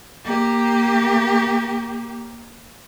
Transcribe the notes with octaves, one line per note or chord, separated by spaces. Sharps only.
A#3 G4